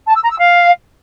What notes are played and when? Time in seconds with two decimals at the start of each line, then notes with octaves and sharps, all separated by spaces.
0.06 A5
0.14 E6
0.22 A#5
0.30 E6
0.38 F5